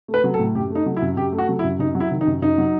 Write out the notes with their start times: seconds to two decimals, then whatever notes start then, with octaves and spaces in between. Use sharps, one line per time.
0.08 A3
0.14 B4
0.24 F#3
0.34 A4
0.39 A2
0.55 F#2 G4
0.70 A3
0.75 D#4
0.86 F#3
0.96 E4
1.02 F#2
1.17 F#2 G4
1.32 A3
1.38 F#4
1.49 F#3
1.59 E4
1.64 F#2
1.79 F#2 D#4
1.95 F#3
2.00 E4
2.11 D#3
2.21 D#4
2.27 F#2
2.42 F#2 D#4
2.58 F#3